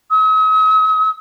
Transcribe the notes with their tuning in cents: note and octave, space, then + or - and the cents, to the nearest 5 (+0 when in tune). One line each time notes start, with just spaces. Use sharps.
D#6 +45